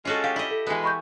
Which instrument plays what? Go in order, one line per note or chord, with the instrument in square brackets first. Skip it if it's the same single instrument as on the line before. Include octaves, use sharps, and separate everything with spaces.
[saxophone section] G#3 C#4 [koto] F4 F#4 A4
[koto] G4 [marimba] F5
[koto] E4 D#5
[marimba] A4
[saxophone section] B2 G#3 [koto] E3 B3
[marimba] B5 C#6 G6